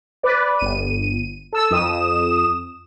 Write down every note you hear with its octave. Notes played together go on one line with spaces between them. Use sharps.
B4 D5
G1 D#7
A4 E6
F2 D#6 E7